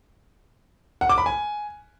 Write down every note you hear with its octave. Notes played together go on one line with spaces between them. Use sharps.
F#5
D6
B5
G#5